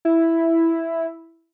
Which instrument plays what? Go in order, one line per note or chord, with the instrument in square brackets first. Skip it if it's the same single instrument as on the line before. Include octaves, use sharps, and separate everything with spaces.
[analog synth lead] E4